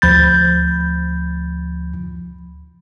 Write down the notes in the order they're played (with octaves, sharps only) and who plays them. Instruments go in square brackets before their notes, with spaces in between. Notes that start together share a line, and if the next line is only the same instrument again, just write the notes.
[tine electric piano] D2 F3 B5 G6 A6